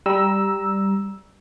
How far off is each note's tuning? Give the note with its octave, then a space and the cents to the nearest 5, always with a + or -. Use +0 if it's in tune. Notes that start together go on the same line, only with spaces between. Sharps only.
G3 +0 A#5 +20 E6 +0